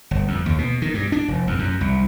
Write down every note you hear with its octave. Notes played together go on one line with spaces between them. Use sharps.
G1
F2
D#2
B2
D#3
G2
D4
F1
E2
F#2
C2